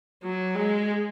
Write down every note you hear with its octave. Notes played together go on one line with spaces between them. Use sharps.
F#3
G#3